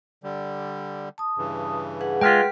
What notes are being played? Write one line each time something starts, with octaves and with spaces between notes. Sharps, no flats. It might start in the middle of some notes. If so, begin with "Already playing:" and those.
D3 G3
A5 D#6
G2 C#3 E3
G#4 B4 F#5
G#3 F4 G5 F6 B6